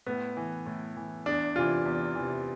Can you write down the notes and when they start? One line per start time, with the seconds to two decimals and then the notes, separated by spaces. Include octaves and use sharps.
0.06 A2 B3
0.37 E3
0.66 A2
0.97 E3
1.26 E2 D4
1.56 C3 E3 F4
1.86 E2
2.15 C3 E3